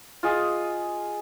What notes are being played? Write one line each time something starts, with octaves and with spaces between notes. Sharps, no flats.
F4 G#4 D#5